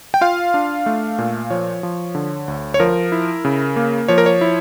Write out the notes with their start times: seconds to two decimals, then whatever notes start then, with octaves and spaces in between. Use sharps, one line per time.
0.14 G5
0.21 F4 F5
0.54 D4
0.86 A3
1.18 A#2
1.51 F3 C#5
1.83 F3
2.15 D3
2.48 D2
2.74 C#5
2.80 F3 A#4
3.12 E4
3.45 C#3
3.76 A#3
4.08 F3 C#5
4.18 A#4
4.26 C#5
4.41 E4